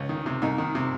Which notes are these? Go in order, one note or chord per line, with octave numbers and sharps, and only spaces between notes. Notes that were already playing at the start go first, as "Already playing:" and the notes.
Already playing: C#2
D#3
C3
C2 D#4
D#3
C3